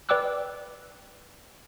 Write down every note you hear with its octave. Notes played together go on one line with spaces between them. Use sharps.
B4 D5 G5 D6 E6 F#6